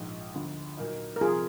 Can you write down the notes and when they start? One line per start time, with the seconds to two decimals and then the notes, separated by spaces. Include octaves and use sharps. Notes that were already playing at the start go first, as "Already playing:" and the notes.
Already playing: A#1 G#2 F3 G#3
0.34 D2 D3 F3
0.77 A#2 F#3 A#3 D#4
1.16 A#4
1.21 F1 F2 F3 A#3 F4 G#4